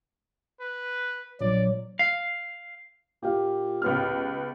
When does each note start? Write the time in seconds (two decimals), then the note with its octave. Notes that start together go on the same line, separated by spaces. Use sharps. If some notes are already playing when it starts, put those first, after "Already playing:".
0.60 B4
1.41 A#1 F#3 D5
1.99 F5
3.23 A#2 G4 F5
3.82 C#2 B3 F6